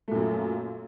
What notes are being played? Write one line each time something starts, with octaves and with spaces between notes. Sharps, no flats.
F#2 A#2 A3